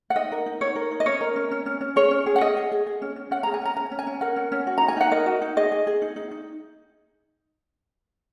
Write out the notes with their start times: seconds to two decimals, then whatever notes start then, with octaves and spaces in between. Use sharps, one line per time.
0.10 F#5
0.16 D#4 D#5
0.32 A#4
0.46 D#4
0.61 D#4 C#5
0.76 A#4
0.91 D#4
1.00 D#5
1.06 C#4 C#5
1.21 A#4
1.36 C#4
1.51 C#4
1.66 C#4
1.81 C#4
1.96 G#4 C#5
2.11 C#4
2.26 G#4
2.36 F#5
2.41 G#4 D#5
2.57 G#4
2.72 G#4
2.87 G#4
3.02 C#4
3.16 C#4
3.31 C#4 F#5
3.43 A#5
3.46 G#4
3.54 G#5
3.61 C#4 A#5
3.76 C#4 A#5
3.91 C#4
3.99 G#5
4.07 C#4
4.21 A#4 F#5
4.36 C#4
4.52 C#4
4.67 F#4
4.78 D#4 A#5
4.88 G#5
4.97 D#4 F#5
5.11 A#4 D#5
5.26 F#4
5.42 D#4
5.57 G#4 D#5
5.72 G#4
5.87 G#4
6.02 D#4
6.16 D#4
6.31 D#4